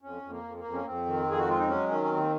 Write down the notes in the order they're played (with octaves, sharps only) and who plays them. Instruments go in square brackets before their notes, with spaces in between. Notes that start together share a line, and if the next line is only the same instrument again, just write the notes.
[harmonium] F2 C#4
F2
A#3
F2
A#3
F2
C#4
F2 C4
D#3
F2 G#4
F#4
G#3 F4
D#4
F#3 C#4
D#3 C#4
C#4
D#2 C4